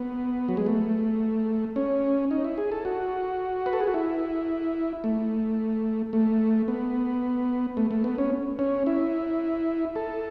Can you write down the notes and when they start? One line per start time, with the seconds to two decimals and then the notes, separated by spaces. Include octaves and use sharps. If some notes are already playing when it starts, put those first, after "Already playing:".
Already playing: B3
0.48 F#3
0.57 G#3
0.66 A3
1.76 C#4
2.31 D#4
2.44 E4
2.58 G#4
2.72 A4
2.85 F#4
3.66 B4
3.73 A4
3.80 G#4
3.87 F#4
3.94 E4
5.04 A3
6.13 A3
6.68 B3
7.77 A3
7.91 A3
8.04 B3
8.18 C#4
8.59 C#4
8.86 E4
9.96 A4